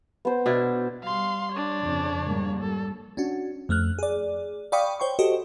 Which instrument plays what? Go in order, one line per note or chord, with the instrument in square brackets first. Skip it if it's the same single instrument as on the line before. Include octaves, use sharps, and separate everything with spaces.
[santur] B3 C5
[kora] B2 D4 E4
[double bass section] G3 [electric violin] F5 C6
[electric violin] D4 C#5
[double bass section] F2 C#3
G#2 G3 A#3
[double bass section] G3 [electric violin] A4
[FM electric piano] C#4 D4 F#4
F2 A3 F6 F#6
G#4 D5
D5 F5 G5 B5 C#6 D#6
C5 C#5 G5 C6 C#6
F#4 G4 A4 C5 D#5